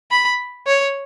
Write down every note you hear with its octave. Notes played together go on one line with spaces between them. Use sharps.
B5
C#5